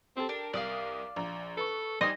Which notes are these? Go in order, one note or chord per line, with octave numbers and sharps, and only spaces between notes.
C4 G4 A4
D4 A#4
C2 D5 F5 D#6
A#1 A#5
A4 B4 C#6
G3 D#4 C5 D#5 G#5 D#6